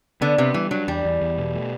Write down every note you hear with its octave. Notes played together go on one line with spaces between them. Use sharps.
D3 B3
C3 B3
E3 G3
F#3 D4
E2 G3
E2
E2
B2
A3